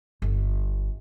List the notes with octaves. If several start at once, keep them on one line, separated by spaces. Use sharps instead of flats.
G1